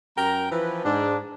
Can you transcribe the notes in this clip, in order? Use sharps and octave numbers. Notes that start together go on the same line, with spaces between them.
F#2 A#4 G5 A#5
E3 F3 B4
G#2 D4